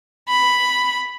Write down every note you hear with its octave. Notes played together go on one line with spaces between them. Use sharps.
B5